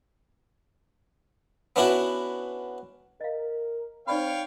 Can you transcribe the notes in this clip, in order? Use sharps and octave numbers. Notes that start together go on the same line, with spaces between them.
B3 C#4 D4 E4 F#4
A#4 D#5 F5
C4 D#4 C#5 D5 F5 G5 B5